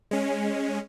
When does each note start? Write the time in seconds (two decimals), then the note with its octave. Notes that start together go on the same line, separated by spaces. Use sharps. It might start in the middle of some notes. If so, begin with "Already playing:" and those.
0.11 G#3 C#4